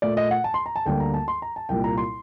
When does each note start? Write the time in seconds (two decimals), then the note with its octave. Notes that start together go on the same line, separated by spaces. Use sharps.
0.02 A#2 A3 D5
0.17 D#5
0.31 F#5
0.44 A5
0.54 C6
0.66 A#5
0.76 A5
0.86 D2 D3 G3 A#3 G5
1.00 A#5
1.14 A5
1.28 C6
1.42 A#5
1.56 A5
1.69 C2 A#2 G3 A#3 G5
1.84 A#5
1.97 C6